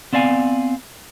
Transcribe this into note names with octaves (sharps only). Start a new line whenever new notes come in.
B3 C4 D5 F5 G#5